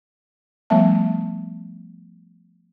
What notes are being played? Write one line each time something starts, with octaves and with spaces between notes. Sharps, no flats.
F3 G3 A3 B3 E5 A5